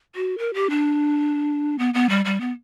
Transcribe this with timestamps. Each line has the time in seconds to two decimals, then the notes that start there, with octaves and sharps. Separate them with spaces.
0.15 F#4
0.38 A#4
0.54 G4
0.70 D4
1.79 B3
1.94 B3
2.09 G3
2.25 G3
2.41 B3